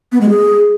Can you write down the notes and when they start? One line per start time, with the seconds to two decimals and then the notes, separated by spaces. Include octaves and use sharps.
0.12 B3
0.21 G#3
0.30 G#4